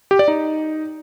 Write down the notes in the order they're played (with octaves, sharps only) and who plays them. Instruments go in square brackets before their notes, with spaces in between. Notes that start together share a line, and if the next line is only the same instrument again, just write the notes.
[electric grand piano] G4
D5
D#4